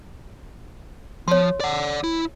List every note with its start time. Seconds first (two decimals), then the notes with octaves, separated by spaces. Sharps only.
1.28 F3 C#5 C6
1.60 D5 F#5
2.04 E4